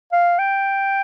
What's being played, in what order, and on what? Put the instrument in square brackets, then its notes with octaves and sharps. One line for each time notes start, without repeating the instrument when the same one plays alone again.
[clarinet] F5
G5